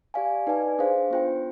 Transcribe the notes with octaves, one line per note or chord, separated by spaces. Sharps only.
G4 D5 F5 G#5
D#4 B4 D5 G#5
D4 G#4 C5 F5
B3 F4 C5 G5